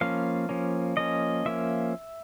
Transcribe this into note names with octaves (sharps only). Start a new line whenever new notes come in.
F3 A#3 C#4 F5
F3 A#3 C#4
F3 A#3 C#4 D#5
F3 A#3 C#4 E5